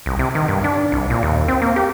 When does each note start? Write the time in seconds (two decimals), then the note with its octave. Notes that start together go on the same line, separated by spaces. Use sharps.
0.06 C2
0.19 C3
0.35 D#3
0.48 G2
0.64 D4
0.92 C2
1.10 A#2
1.23 D#2
1.48 C4
1.62 A#3
1.76 G4